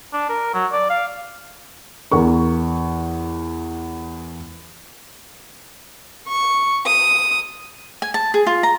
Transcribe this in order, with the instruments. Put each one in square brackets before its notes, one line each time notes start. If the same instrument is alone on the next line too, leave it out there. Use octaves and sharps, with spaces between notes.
[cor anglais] D4
A#4
F#3
D5
F5
[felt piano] E2 A#4 C#6
[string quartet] C#6
D#6
[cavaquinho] G#5
A5
G#4
F4
A#5